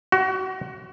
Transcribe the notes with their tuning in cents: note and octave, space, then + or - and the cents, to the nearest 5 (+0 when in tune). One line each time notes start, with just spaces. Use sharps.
F#4 +30